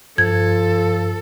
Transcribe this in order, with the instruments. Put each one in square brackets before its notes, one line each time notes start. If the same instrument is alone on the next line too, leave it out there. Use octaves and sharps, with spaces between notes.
[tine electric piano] G2 [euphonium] F3 [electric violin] A4 [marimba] G#6